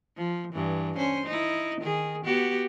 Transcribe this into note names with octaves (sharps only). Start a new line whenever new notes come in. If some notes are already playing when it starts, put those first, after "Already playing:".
F3
G2 E3
C#4 C5
D#4 E4
D#3 G#4
B3 F#4 G4